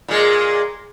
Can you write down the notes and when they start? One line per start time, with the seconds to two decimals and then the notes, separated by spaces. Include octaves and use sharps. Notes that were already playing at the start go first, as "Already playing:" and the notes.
0.08 A#2 G#3